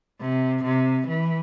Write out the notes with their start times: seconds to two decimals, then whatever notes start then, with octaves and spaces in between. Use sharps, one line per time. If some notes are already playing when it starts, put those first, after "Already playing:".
0.21 C3
0.64 C3
1.08 E3